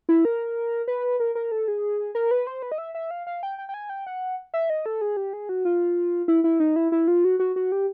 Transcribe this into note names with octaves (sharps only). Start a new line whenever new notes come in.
E4
A#4
B4
A#4
A#4
A4
G#4
A#4
B4
C5
B4
D#5
E5
E5
F5
F5
G5
G5
G5
G#5
G5
F#5
E5
D#5
A4
G#4
G4
G#4
F#4
F4
E4
E4
D#4
E4
E4
F4
F#4
F#4
F#4
G4